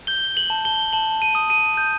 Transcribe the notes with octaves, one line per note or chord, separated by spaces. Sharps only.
G6 G7
F#7
A5
G7
A5 F#7
D#7
D#6
D#7
G6